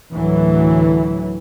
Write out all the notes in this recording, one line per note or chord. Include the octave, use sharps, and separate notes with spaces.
D2 A2 E3 F#3